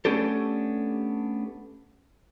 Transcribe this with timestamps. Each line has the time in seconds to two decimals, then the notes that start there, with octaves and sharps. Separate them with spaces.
0.05 A3 B3 C#4 D4 G4 A4